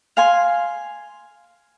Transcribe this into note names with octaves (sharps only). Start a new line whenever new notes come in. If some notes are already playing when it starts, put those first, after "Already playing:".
F5 G#5 C6